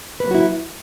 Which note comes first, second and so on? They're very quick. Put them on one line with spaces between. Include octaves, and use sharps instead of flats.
B4 A#3 F#3 F#4 E4